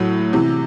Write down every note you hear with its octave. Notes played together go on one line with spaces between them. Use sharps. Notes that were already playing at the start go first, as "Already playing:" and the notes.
Already playing: A2 F#3
C3 E3